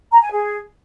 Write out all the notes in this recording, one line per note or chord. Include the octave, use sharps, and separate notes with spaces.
A#5
G#5
G#4